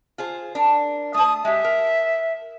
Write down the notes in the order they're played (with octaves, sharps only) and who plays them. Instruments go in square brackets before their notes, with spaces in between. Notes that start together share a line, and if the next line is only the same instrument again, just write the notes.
[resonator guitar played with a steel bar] F4 G#4 C5
D4 A#4
[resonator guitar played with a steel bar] A3 A5 [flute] D#6
[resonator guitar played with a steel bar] G#3 G4 [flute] E5
[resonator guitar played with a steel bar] A#4